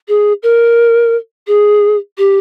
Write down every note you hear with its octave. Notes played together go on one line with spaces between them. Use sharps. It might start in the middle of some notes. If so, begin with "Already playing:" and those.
G#4
A#4
G#4
G4